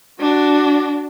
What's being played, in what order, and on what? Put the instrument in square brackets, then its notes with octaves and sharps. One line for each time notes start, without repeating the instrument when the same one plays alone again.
[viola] D4 F#4